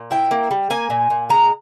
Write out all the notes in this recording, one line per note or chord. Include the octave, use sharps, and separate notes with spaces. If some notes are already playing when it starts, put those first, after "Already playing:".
Already playing: A#2
E4 G5
A#3
G3
A#3 G#5
A#2
A#2
G#3 A#5